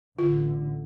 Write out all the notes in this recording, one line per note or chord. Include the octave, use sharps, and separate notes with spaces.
A1 D3 F4